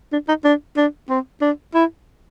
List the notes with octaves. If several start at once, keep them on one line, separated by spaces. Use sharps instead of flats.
D4
D#4
D4
D4
C4
D4
E4